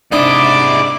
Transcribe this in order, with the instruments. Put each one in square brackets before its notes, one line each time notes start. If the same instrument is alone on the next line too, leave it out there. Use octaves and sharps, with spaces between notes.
[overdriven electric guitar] G#2 E4 [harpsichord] C3 D4 D#5 [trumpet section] D5 D6